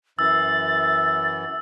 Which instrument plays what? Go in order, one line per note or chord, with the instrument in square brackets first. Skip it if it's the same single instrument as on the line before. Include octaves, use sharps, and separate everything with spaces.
[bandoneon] F#2 E3 [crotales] E6 [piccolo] A6